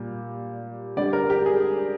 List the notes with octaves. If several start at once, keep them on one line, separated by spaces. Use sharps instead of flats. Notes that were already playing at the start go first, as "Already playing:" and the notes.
Already playing: A#2 G3
D3 G3 D5
A#4
G4
G#4